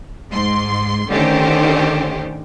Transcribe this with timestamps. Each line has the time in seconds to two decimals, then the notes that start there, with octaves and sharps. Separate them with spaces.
0.30 G#2 C6
1.08 D3 D#3 A3 C#4 G4 C5